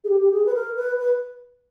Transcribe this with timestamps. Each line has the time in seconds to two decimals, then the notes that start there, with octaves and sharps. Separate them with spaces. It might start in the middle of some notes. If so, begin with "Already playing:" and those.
0.04 G#4
0.09 G4
0.21 G4
0.32 G#4
0.46 B4
0.54 A#4
0.76 B4
0.99 B4